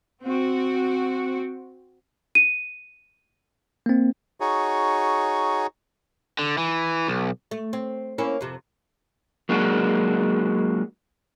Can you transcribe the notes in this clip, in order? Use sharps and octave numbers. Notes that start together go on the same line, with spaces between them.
C4 F#4
D#7
A#3 C4
D#4 F#4 G#4 C#5
D3
E3
B1
A3
C4
A#3 C#4 E4
F2 C3
F#3 G#3 A#3 D4 F#4